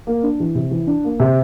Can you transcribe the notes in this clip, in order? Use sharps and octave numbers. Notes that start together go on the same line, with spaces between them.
A#3
D4
E3
C3
E3
D4
A#3
C3